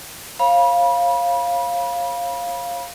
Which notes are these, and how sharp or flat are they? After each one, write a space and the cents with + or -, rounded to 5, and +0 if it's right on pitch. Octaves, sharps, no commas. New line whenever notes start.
C#5 -40 F5 +0 B5 -30